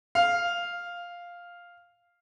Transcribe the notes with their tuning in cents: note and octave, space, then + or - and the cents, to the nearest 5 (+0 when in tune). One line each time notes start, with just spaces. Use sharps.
F5 +5